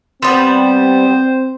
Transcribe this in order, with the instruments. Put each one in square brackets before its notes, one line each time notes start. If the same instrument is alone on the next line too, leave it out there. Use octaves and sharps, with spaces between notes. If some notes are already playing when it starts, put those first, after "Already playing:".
[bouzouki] G3 B3 [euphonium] C4 [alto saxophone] C5 [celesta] C6